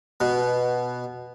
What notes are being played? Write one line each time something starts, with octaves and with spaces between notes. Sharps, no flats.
B2